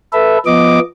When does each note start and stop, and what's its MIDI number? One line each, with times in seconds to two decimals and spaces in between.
0.13 0.38 69
0.13 0.38 71
0.13 0.38 76
0.46 0.79 53
0.46 0.79 59
0.46 0.79 75
0.46 0.79 86